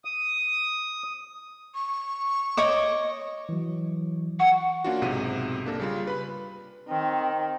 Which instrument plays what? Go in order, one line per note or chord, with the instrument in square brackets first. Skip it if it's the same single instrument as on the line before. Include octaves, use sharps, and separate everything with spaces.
[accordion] D#6
[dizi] C#6
[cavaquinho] C#5 D#5 D6
[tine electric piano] E3 F#3
[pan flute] F#5 [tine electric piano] C#6
[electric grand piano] A#3 C#4 D4 F4 F#4
B1 G#2 C3 D#7
A#3 D4 A4 A#4
C#3 G3 F4
B4 B5
[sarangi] D#3 [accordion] C4